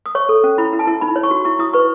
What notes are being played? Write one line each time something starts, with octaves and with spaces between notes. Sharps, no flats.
D#6
C#5 C#6
A4
C#4
E4 B5
E4
A5
E4
D#4 B5
C#5
C#6
F#4
E4 C#6
E4 D#6
B4 C#6